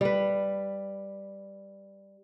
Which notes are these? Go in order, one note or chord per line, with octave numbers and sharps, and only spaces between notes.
G3 B4